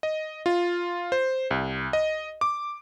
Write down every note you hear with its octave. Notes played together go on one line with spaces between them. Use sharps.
D#5
F4
C5
C2
D#5
D6